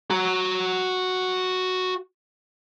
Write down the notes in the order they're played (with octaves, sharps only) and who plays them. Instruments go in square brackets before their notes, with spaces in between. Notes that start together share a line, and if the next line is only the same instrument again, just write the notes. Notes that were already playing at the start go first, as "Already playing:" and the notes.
[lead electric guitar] F#4 A#5